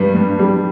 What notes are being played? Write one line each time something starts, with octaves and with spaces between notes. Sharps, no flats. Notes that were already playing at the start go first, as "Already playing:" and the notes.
Already playing: G2 G3
G2
G3